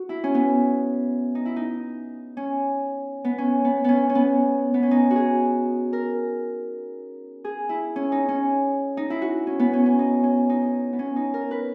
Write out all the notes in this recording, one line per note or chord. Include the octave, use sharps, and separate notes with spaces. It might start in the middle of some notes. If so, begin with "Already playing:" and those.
Already playing: F#4
E4
C#4
B3
D#4
E4
D#4
C#4
B3
C#4
B3
B3 C#4
C#4
B3
B3
C#4
D#4
F#4 G#4
A#4
G#4
E4
C#4
D#4
C#4
D#4
E4
F#4
C#4
B3
C#4
C#4
D#4
C#4
D#4
B3
C#4
D#4
A#4
B4